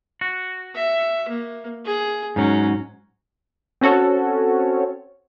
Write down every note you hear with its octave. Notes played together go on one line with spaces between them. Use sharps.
F#4
E5
A#3
G#4
G#2 F#3 C#4
C4 C#4 F#4 A4 C#5